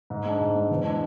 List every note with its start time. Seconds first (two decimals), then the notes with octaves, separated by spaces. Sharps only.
0.10 G#2
0.25 G#3 D4
0.40 G#2
0.55 G#3 D4
0.71 E2
0.85 B2 G#3 D4